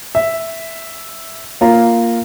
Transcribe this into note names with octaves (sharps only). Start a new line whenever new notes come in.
E5
A#3 F4 A#5